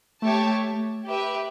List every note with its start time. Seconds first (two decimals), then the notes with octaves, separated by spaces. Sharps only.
0.22 A3 G4 C#5 E5 A5
1.06 G4 B4 E5